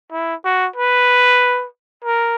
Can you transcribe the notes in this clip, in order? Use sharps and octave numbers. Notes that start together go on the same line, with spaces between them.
E4
F#4
B4
A#4